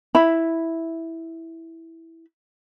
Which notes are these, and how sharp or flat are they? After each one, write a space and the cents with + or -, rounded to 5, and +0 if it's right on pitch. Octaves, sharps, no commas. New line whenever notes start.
E4 -5 E5 +0 B5 +0